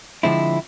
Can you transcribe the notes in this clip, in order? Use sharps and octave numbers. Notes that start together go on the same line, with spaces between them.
D3 F3 G#3 C4 E4